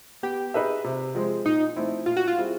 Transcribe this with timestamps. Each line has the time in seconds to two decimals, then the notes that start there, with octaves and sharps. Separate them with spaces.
0.23 B3 G4
0.54 D#4 G#4 B4 E5
0.84 C3
1.15 F3 G#3 C4
1.45 A#2 D#4
1.76 F3 A3 C4 E4
2.06 A#2 F4
2.17 F#4
2.28 F4
2.37 G3 C4 E4 G#4